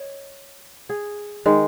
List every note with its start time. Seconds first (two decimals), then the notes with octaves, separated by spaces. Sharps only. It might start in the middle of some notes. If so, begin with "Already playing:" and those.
Already playing: C#5 D#5
0.89 G#4
1.46 D#3 G#3